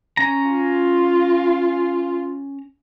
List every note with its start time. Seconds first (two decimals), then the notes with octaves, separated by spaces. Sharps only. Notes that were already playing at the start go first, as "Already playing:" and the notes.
0.17 C#4 A#5
0.49 F4